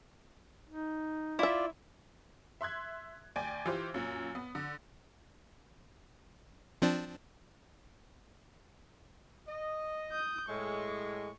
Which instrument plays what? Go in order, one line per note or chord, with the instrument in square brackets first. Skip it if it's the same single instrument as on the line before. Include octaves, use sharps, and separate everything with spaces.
[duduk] D#4
[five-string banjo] E4 E5 [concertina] F4 D5
[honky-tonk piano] E5 C6 F#6 G#6
D2 D5 G5 G#5
E3 F4 G4 C5
F#2 A#2
B3
D3
[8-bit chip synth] F3 C4 D4
[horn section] D#5
[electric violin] D#6 G6
[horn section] A2 G#3 [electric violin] C#6